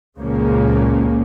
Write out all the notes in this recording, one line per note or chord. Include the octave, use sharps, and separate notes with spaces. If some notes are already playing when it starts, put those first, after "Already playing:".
C#2 A#2 C#3 F3 A#3 C#4